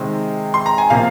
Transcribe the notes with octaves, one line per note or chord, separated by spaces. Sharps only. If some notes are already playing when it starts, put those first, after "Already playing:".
Already playing: C3 D#3 G#3 C4
C6
A#5
G#5
C3 F3 A#3 F4 F5